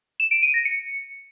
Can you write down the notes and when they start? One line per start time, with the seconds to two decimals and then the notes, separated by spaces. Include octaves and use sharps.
0.20 E7
0.31 D7
0.43 D#7
0.54 A#6
0.65 C#7